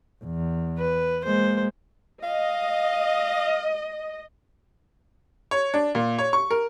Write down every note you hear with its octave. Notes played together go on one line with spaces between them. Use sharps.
E2
B4
G#3 A#3 C5
D#5 F5
C#5
D4
A#2
C#5
C#6
A#4